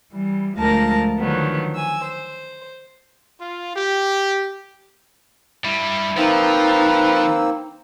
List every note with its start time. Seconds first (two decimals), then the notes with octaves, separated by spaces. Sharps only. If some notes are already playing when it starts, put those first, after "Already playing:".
0.12 E3 G3
0.57 D2 F3 G#3 A#4 A5 A#6
1.18 D3 D#3 F3 F#3 B3
1.74 G#5 E6
2.05 C5
3.39 F4
3.75 G4
5.65 G2 G3 E4
6.17 F3 A#3 C4 D#4 B4 E6